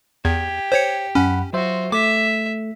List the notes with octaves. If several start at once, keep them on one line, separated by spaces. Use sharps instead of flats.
E2 G4 G#6
C5 C#5 C#7
F#2 C#4 F#5 B5
F#3 F4 F#4 C5 E5
A3 E5 D6